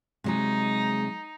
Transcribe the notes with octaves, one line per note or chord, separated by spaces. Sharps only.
C3 F#3 G#3 D#4 G#4